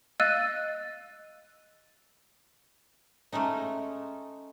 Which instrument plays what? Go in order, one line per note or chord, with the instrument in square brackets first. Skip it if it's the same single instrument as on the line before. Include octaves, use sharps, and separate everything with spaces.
[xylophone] D#5 F5 E6 F#6 A6 D#7
[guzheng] G#3 A3 C#4 D#4